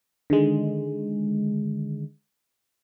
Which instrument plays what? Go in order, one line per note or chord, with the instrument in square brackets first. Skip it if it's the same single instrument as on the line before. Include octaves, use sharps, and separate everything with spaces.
[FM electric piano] D3 D#3 G#3